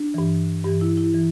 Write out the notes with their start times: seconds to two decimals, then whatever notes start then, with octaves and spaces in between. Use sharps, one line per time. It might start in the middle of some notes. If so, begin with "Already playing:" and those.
Already playing: D4
0.14 G2 E3
0.64 G2 E3 G4
0.81 E4
0.97 E4
1.14 E3